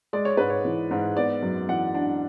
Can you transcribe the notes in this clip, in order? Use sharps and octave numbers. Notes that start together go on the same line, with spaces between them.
G#3 D5
C#5
G#2 B4
C#5
E3
G#2
B3 D5
F#2
E3 F#5
D4